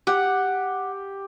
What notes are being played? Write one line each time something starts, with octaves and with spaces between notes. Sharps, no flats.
G4 F#5